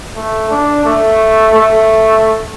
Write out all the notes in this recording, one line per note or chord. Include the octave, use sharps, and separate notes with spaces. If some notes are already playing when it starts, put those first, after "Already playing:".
A3
D4
A3
A3